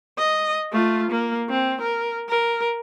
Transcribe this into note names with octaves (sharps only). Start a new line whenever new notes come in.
D#5
A3 F4
A#3
C4
A#4
A#4